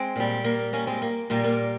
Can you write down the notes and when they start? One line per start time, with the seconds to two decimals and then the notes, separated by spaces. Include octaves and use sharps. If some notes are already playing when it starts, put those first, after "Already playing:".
Already playing: G#3 C4
0.16 A#2 G3
0.44 A#3
0.73 A#3 C#4
0.87 G#3 C4
1.02 A#3
1.30 A#2 G3 A#3
1.44 A#3